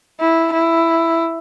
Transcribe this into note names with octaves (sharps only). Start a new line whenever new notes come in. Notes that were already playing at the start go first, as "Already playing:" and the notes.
E4
E4